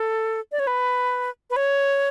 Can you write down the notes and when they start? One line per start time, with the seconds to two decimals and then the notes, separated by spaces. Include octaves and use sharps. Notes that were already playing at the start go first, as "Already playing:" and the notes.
Already playing: A4
0.52 D5
0.59 C#5
0.67 B4
1.50 B4
1.56 C#5